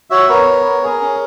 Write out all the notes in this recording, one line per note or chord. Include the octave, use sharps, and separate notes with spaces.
F#4 C#5 E5
B3 A#4 C#5
B3
B3
G#4 A#4
C#4